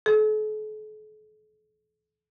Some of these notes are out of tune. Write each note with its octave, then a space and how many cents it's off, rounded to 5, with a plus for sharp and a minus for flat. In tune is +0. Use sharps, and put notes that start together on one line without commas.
A4 -45